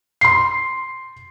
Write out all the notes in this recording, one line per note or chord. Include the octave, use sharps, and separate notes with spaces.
C6 C7